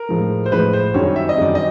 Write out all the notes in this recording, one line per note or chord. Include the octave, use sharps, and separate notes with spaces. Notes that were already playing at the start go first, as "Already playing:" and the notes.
Already playing: A#4
A2 F3 G#3
C5
A2 F3 G#3 B4
C5
F#2 D#3 G3 C4 C#5
E5
D#5
F#2 D#3 G3 C4 D5
D#5